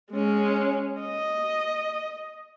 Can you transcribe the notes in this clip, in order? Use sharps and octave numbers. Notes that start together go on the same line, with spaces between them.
G#3 C#4
D#5